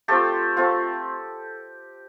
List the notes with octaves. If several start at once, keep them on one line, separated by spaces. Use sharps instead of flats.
A3 C4 F4 G4 A4
A3 C4 F4